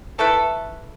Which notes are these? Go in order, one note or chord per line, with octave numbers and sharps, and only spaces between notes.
A3 E4 A4 B4